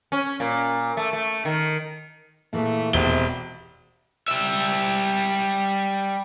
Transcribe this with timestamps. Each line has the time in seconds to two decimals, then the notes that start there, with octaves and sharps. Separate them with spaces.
0.12 C#4
0.40 A#2
0.97 A3
1.13 A3
1.45 D#3
2.53 A#2 E3 A3 G#4
2.93 E1 C3 G7
4.28 G3 E5